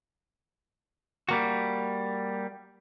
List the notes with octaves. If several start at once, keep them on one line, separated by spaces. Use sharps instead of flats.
G3 A#3 F#4